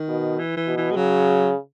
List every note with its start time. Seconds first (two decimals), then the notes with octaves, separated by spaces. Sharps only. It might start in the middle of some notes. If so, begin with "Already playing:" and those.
Already playing: D#3
0.09 B2
0.39 E3
0.57 E3
0.67 B2
0.77 E3
0.91 G#3
0.96 C#3 F#3